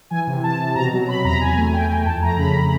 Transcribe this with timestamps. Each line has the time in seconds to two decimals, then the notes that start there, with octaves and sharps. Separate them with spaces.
0.10 E3 G#5
0.27 C3
0.43 C3 A5
0.59 C3
0.75 B2 A#5
0.92 F#3
1.08 B2 B5
1.24 E2 A#5
1.40 E2 G#5
1.57 A3
1.73 E2 G5
1.90 E2
2.06 F2 A5
2.22 A3 A#5
2.37 C#3 B5